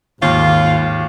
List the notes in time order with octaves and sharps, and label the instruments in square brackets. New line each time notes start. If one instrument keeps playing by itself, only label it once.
[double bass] G#1 [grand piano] D#2 [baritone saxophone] F4